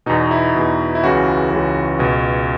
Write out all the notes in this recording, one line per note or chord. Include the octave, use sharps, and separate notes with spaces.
E2 B2 D#4
E4
E2 B2
E4
C#2 C#3 E3 F#4
C#2 C#3 E3
C#2 B2